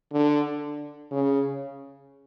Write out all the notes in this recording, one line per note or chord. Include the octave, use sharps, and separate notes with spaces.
D3
C#3